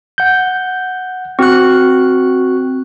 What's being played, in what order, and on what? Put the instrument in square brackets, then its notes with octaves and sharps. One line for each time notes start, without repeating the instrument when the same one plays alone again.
[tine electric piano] F#5 G6
[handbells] C4 F#6 [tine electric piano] F#4 C#6